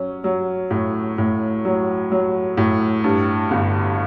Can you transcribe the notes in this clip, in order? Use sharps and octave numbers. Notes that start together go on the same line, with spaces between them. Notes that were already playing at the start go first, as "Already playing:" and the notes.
Already playing: F#3 C#4
F#3
A2
A2
F#3
F#3
A2
G2
G1